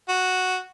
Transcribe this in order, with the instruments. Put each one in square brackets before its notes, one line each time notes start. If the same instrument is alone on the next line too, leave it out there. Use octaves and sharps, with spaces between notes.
[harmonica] F#4